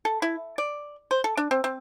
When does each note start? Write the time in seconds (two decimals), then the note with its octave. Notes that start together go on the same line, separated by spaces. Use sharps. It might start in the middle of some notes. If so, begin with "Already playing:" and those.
0.05 A4
0.22 E4
0.58 D5
1.11 C5
1.24 A4
1.37 D4
1.51 C4
1.64 C4